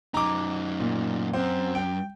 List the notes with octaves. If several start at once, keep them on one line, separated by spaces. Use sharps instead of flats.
F#2 D#4 A#5 D6
A#2
F#2 C4
G5